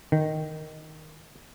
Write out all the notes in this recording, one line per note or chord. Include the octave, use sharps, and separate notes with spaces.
D#3